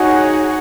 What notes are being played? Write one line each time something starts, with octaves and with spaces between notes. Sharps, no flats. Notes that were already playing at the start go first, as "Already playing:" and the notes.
Already playing: D#4 F#4 G#4 C#5 F#5